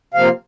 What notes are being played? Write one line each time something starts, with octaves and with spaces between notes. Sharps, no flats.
C3 F3 A#3 F5